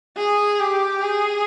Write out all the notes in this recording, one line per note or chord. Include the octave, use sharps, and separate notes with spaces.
G#4
G4
G#4